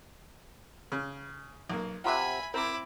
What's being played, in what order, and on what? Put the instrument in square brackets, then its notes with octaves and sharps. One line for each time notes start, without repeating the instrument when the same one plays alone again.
[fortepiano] C#3
B1 A#3
[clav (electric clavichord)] C3 F#5 [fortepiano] F4 E5 [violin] G#5 B5
[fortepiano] C4 [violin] E4 D6 [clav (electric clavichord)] A#4